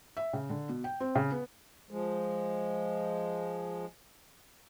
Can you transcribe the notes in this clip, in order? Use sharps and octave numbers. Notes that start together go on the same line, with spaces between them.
E5
C#3
D3
B2
G5
C4
C#3
B3
F3 G#3